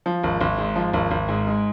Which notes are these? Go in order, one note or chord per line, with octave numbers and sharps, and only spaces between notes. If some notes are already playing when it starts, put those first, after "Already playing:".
F3
G#1
G#1
G#2
F3
G#1
G#1
G#2
G#3